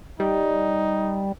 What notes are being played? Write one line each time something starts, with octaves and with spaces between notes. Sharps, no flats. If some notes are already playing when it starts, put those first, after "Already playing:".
G3 D#4